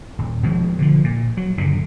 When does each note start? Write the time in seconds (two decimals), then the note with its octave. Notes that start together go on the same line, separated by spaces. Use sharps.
0.18 D#1
0.43 B2 F3 G#3
0.79 D3 F3
1.04 A#2
1.37 F#3
1.57 F#1 A#2 D3